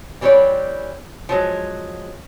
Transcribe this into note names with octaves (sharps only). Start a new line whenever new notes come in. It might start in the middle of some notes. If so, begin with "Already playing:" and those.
E3 G3 C4 A#4 C#5 D5
F3 F#3 G#3